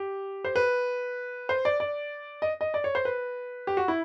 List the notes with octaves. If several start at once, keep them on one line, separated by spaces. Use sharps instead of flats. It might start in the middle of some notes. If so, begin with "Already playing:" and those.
Already playing: G4
C5
B4
C5
D5
D5
D#5
D#5
D5
C#5
C5
B4
G4
F#4
E4